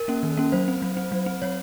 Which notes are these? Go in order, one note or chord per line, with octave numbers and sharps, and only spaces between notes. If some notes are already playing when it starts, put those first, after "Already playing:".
Already playing: A#4
A#3 C#4
D#3
A#3 C#4
F#3 C5
C4
F#3
C4
F#3
C4
F#3 C#5